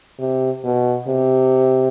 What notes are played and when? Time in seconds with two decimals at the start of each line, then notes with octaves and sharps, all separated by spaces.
0.19 C3
0.64 B2
1.08 C3